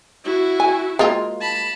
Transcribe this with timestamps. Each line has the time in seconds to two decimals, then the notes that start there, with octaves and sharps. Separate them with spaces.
0.25 E4 F#4
0.60 G#5
0.99 G#3 A#3 F4
1.41 A5 B5